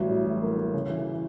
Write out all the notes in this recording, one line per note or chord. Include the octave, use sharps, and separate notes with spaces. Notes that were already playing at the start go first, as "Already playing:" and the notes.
Already playing: A1 F#3 G3
A2
A2
A#3
A#3
C#3
E3